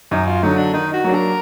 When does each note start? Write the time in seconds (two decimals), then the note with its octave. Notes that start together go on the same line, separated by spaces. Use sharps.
0.11 F#2 D#4
0.27 F4
0.43 D3 F#3 D#4
0.57 D4
0.73 D#3 D#4
0.93 F#4
1.04 F#3 A#3 D4
1.15 A#4